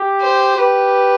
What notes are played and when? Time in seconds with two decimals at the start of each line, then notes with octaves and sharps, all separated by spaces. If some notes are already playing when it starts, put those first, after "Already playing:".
Already playing: G4
0.22 C5
0.57 G4 B4